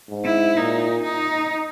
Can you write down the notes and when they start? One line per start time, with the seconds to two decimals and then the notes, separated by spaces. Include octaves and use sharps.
0.10 G#2
0.25 E4
0.56 A#2 D#4
1.03 D#4